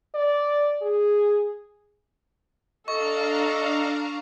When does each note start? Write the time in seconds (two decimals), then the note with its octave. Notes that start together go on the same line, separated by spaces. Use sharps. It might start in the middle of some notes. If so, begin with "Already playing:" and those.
0.14 D5
0.82 G#4
2.88 D4 A4 D#5 F5 A#5 C#6